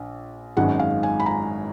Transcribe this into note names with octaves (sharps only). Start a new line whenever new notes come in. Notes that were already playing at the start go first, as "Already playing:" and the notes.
Already playing: A#1
G#1 F#2 D#3 G#3 F#5
F5
G#5
B5
A#5